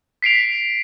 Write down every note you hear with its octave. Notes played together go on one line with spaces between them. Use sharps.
B6 C7 D7 F7